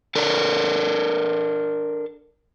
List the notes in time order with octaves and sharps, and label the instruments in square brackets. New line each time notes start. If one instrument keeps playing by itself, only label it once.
[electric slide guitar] D4 A4 A#4